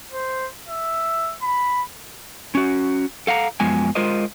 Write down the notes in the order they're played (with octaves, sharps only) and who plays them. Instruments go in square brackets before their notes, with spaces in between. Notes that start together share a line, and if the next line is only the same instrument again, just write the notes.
[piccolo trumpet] C5
E5
B5
[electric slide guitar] C#4 F#4
A4 F5 F#5 A#5
F#2 F3 G#3 B3 G#5
G#3 F4 A#4 C5 D#5